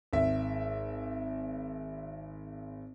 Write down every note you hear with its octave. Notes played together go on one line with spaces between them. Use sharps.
G#1 E5